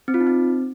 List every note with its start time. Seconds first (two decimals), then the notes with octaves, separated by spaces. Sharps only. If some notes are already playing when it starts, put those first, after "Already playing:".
0.08 C4
0.14 F4
0.20 D#4
0.27 C4